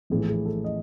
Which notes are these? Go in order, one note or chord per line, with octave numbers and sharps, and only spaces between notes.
A#1 A2 E3 G#4
G#4
A4
D#5